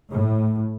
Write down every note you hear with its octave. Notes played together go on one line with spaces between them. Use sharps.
A2